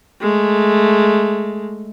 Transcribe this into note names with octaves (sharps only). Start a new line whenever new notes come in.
G#3 A3